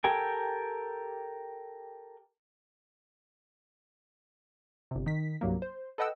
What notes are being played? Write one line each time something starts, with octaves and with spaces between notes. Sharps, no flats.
G4 A4 A#4 G5 G#5
G1 C3
D#3 B6
C2 G2 F#3 A#3
C5
A4 B4 D#5 F#5 G5 E6